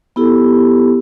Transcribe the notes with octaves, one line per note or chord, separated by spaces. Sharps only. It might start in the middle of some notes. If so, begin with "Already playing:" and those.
B3 E4 G4 A4